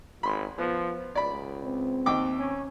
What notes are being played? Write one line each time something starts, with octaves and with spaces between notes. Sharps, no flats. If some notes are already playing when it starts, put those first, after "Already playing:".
G#1 B5 C6
F3 B3
C#2 D5 B5
C4
D#2 G5 D6
C#4